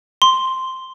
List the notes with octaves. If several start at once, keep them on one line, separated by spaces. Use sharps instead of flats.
C6